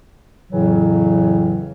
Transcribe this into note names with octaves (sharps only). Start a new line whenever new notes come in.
F2 A2 C#3 E3 F#3